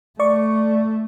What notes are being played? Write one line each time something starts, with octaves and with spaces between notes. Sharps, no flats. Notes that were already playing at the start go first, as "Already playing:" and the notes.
A3 D5 C#6